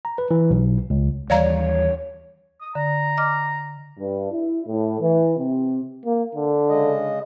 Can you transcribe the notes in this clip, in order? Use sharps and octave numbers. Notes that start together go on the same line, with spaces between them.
A#5
B4
E3
B1
C#2
D#2 E3 G3 C#5 D5 F5 A#5
D#6
D3 A#5
D#5 D6 F6
G2
E4
A2
E3
C3
A#3
D3
C#3 G#3 D#5